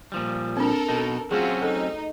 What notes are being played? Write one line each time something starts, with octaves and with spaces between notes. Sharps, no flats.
A#2 F3 G3
C4 D4 A4 A#4
B2 D#4
F#3 A3 C4 C#4 F4 F#4 G#4
D#4 A4